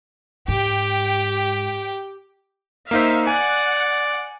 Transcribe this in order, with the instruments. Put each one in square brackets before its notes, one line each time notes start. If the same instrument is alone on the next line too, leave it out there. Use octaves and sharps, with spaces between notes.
[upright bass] G#2 [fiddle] G4 G5
[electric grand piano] A#3 D#4 C5 [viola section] E5 F5
[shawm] D5 [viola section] F#5 [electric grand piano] G#5